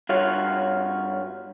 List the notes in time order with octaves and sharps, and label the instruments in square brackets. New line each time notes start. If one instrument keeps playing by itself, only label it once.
[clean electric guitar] G2 F4 F#4 [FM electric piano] C#5 F6